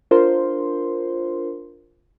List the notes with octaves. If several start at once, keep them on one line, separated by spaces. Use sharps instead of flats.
D4 F4 A#4 C5 C6